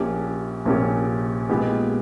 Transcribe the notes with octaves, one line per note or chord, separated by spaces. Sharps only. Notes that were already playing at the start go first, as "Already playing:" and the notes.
Already playing: A#1 A#2 A#3 C#4 G4
A#1 A#2 A#3 C#4 G4
A#2 G#3 B3 D#4 G4